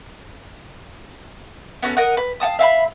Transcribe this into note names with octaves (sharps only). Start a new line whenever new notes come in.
B3 C#4 F#4 A4
A#4 D#5 F#5
B4
F5 F#5 A5 D#6
E5 F5 A#5 B5